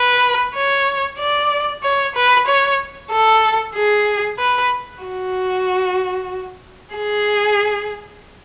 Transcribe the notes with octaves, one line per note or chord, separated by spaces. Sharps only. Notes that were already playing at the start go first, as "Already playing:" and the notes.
Already playing: B4
C#5
D5
C#5
B4
C#5
A4
G#4
B4
F#4
G#4